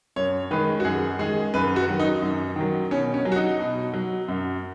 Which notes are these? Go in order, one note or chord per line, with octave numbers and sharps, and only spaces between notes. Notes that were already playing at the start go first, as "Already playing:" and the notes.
F#2 C#5
D#3 G#3 B4
F#4
F#2 G#4
D#3 G#3 G#4
F#2 B4
F#4
D#3 F#3
D#4
F#2
D#3 F#3
B2 C#4
C#4
F#3
F#4
D#4
B2
F#3
F#2